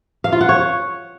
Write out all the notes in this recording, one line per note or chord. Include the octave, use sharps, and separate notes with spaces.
F5
F4
F#5
C#5